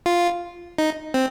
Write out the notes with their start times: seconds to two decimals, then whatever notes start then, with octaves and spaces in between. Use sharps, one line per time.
0.06 F4
0.78 D#4
1.14 C4